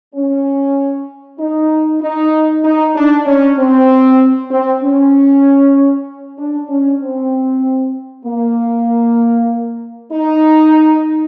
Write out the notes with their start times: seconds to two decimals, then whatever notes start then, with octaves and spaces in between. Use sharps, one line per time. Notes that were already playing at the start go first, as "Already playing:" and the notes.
0.15 C#4
1.39 D#4
2.01 D#4
2.64 D#4
2.95 D4
3.26 C#4
3.57 C4
4.51 C4
4.83 C#4
6.39 D4
6.69 C#4
7.01 C4
8.25 A#3
10.12 D#4